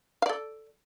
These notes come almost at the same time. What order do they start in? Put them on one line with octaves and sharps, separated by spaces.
F5 D5 A4